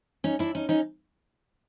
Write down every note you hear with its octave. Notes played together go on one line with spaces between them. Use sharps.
C#4 D#4
D4 E4
C#4 D#4
C#4 D#4